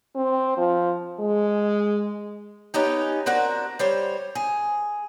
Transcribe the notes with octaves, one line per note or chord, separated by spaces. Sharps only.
C4
F3
G#3
B3 C#4 D#4 G4
C4 D4 F#4 A#4
G3 C5 C#5
G#4